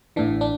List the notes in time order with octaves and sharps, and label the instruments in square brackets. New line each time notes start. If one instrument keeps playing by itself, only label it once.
[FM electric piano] A1 A2 E3 D4
D4